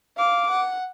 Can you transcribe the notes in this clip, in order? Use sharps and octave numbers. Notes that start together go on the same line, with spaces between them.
F5 D6
F#5